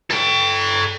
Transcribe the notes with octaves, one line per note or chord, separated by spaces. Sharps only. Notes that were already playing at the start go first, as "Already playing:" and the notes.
A4 G5